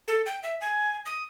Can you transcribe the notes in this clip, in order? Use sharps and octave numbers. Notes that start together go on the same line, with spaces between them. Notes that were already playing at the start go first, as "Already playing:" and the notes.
A4
G5
E5
G#5
D#6